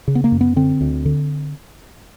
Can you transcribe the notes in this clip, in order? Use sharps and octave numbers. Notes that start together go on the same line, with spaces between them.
C#3
B3
A#3
F#2
B3
D3 C4
D2
D3